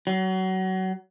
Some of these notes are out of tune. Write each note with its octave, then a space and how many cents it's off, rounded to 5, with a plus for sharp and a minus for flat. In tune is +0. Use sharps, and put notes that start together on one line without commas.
F#3 +25